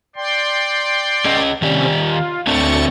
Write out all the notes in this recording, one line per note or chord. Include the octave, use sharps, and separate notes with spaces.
D5 G5 C6
C#4 G#4 D#5
C3 D#3 C4 C#4 G4 D5
F4
D2 A3 C4 D4 C#6 A6